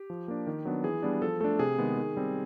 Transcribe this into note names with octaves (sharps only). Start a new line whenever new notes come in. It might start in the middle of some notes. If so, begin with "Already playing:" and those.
Already playing: G4
F3
A#3 D4
D#3
F#3 B3 D4
E3 G#4
G3 B3 D4
F3 A4
A3 D4 A4
C3 G#4
D#3 G#3 B3
D#3
G3 C4